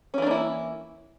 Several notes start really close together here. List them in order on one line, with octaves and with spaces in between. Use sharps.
C#4 E3 D4 A#3 E4